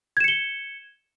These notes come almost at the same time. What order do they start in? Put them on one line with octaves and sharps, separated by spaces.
G#6 E7 C#7 G7